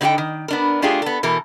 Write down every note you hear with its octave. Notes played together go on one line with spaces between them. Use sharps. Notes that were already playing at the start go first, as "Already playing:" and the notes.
D3 C4 D#4 F#4 A4 G5
D#3
B3 D4 A#4
A3 D4 F4 G4 G#4
B3 A4
B2 E3 A4 A#4